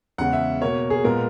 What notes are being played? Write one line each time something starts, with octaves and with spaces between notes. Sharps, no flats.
E2 C#3 G#3 F#5
E5
B2 A#3 C#5
G#4
A#2 G#3 B3 A#4